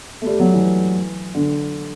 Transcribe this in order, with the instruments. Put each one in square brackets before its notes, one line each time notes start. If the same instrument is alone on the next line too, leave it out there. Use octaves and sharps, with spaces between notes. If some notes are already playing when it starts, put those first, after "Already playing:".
[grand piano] A3
G3
F#3
E3
D3